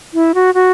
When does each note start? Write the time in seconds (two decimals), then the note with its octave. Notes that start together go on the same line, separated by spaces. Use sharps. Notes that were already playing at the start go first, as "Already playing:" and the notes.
0.14 E4
0.35 F#4
0.54 F#4